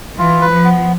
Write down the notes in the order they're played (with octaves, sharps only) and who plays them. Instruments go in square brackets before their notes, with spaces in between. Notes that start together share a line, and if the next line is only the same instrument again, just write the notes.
[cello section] E3 [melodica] F4
[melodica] B4
[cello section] F3
[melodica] B3